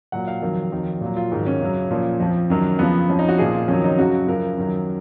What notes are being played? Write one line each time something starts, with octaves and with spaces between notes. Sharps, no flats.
A#2 F#3 F#5
F5
F2 D#3 F#3
F2 D#3 F#3
A#2 F#3
F4
G#2 D#3 F#3
C#4
F#2 C#3 F#3
A#2 F3
F2 F3
F#2 D#3 F#3
F2 C#3 F3 B3
F2 F3 C#4
D#4
F#4
A#2 F3 G#4
F4
F2 D#3 F#3 C#4
D#4
F#2 C#3 F#3 F#4
F#2 C#3 F3 A#4
F#2 D#3 F#3